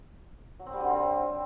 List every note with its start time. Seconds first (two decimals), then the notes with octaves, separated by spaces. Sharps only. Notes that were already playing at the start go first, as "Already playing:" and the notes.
0.59 F#3
0.66 C4
0.73 G3
0.80 D3
0.87 C4